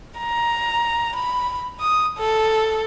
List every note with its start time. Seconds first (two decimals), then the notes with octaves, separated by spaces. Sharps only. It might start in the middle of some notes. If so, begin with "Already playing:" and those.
0.19 A#5
1.16 B5
1.80 D#6
2.18 A4